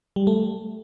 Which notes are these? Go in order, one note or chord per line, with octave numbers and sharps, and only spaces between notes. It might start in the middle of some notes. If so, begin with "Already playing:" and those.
G3
A3